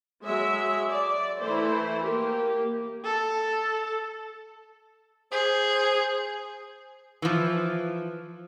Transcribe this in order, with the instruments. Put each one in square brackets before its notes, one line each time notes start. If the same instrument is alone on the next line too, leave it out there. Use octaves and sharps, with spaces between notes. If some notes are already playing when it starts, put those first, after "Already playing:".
[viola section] F#3 G#3 E5
D5
E3 A3 E4 C5
A#3 G4
[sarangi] A4
[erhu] G#4 [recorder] C5
[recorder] C5
[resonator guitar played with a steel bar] E3 F3